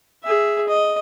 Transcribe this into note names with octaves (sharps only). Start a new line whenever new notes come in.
G#4 E5
D#5